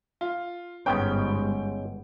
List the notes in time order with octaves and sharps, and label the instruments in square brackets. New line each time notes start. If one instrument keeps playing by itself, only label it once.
[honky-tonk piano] F4
[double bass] G1 G#2 [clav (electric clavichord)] G#3 B3 C#4 [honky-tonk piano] G5